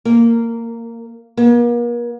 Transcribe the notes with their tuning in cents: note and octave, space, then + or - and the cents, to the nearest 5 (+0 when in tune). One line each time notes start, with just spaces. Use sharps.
A#3 -15
A#3 +40